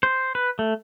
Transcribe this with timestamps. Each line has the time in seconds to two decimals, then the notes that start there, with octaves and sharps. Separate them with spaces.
0.03 C5
0.35 B4
0.59 A3